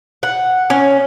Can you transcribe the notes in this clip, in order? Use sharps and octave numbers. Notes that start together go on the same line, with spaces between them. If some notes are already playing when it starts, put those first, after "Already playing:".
F#5
C#4